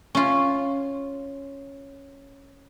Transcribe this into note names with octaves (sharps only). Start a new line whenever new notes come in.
C#4 F4